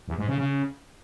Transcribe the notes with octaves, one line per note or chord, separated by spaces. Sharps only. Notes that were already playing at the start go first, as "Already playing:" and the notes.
E2
G#2
C#3
C#3